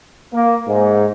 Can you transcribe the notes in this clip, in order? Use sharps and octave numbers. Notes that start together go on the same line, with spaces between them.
A#3
G#2